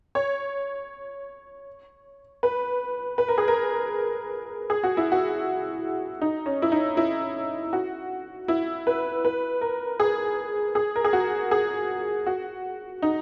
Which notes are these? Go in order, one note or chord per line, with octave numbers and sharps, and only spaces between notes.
C#5
B4
B4
A#4
G#4
A#4
G#4
F#4
E4
F#4
D#4
C#4
E4
D#4
E4
F#4
E4
B4
B4
A#4
G#4
G#4
A#4
G#4
F#4
G#4
F#4
D#4